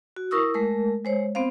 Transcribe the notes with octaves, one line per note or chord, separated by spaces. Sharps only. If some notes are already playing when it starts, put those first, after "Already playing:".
F#4
E4 A#4 C#6 D#6 E6
G#3 A3 A#4
G#3 C5 C#5
B3 C4 C5 F5